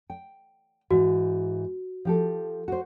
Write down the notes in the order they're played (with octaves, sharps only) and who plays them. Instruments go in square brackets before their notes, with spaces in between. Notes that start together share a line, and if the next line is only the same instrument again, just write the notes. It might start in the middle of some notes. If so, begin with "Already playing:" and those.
[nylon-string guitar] G5
[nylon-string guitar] G#2 E3 [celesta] F#4
[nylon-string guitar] F3 G4 A4
F#4 C5